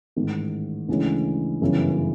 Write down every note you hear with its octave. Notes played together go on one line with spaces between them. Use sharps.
A1 G#2 D#3
D2 C#3 E3 G#3 C#4
G1 F#2 C#3 E3